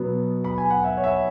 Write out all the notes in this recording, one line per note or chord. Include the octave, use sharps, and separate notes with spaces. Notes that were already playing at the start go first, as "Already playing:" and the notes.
Already playing: B2 F#3 B3
B5
G#5
F#5
E5
C#5
E5